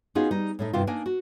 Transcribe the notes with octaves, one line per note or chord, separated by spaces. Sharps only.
B3 C#4 D#4 F4 F#4 G#4
G3 D#4
A2 A3 D#4
G2 C3 D#3 E4 F4
A#3 D4 D#4 A#4 G#5
F#4